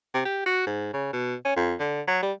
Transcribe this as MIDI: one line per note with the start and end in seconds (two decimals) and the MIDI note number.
0.14 0.21 48
0.25 0.42 67
0.46 0.65 66
0.66 0.93 44
0.93 1.11 49
1.13 1.35 47
1.45 1.54 61
1.56 1.74 41
1.80 2.01 50
2.07 2.20 54
2.22 2.32 55